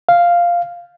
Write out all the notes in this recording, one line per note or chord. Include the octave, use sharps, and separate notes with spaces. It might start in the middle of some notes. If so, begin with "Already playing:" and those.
F5